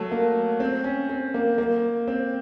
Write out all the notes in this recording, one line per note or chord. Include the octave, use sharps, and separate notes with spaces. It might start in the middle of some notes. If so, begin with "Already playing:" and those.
Already playing: F#3 A3
A#3
C4
C#4
C4
A#3
A#3
C4